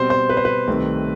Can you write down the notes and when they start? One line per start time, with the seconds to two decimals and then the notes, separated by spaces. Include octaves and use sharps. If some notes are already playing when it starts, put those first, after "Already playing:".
Already playing: B2 G3 C4 C5
0.10 C5
0.29 B4
0.37 C5
0.45 B4
0.67 C2 C3 D#3 A3 C4